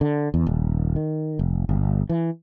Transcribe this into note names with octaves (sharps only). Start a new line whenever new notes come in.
D3
E2
D#1
D#3
F1
G1
E3